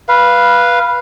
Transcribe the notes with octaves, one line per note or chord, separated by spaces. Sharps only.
B4 F5